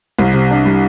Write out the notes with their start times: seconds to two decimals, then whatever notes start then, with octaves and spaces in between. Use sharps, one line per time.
0.19 C2
0.34 C3
0.51 D4
0.65 G3